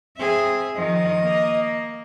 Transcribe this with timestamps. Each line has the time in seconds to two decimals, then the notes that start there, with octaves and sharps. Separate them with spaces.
0.18 C4 G#4 E5
0.75 D#3 F3 D#5
1.23 A#3